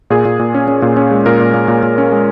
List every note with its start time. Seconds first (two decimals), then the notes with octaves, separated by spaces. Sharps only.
0.10 A#2 G#4
0.25 A#2
0.39 A#2
0.55 C#4
0.68 C#4
0.82 A#2
0.97 C#4
1.11 G#3
1.26 A#2 A#4
1.40 A#2
1.54 A#2
1.68 A#2
1.83 A#2
1.98 C#4
2.12 G#3